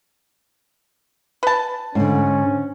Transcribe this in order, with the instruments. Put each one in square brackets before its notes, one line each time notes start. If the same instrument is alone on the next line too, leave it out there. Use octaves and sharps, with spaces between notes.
[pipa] B4 A5
[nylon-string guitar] G#2 D3 [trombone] C#4